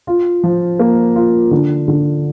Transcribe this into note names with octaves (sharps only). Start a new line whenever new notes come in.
F4
F3
A#3
F4
D3
D3